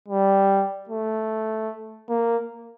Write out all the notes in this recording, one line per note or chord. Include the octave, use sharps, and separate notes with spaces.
G3
A3
A#3